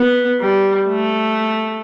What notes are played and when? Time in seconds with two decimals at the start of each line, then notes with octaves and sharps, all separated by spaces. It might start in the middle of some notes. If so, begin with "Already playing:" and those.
Already playing: B3
0.41 G3
0.88 A3